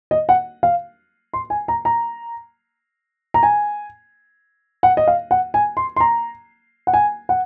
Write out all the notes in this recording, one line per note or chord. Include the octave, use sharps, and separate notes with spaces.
D#5
F#5
F5
C6
G#5
A#5
A#5
A#5
G#5
F#5
D#5
F5
F#5
G#5
C6
C6
A#5
F#5
G#5
F#5